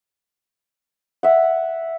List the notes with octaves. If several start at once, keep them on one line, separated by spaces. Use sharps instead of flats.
E5 F#5